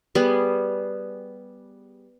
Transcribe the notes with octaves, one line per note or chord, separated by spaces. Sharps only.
G3 B3 G#4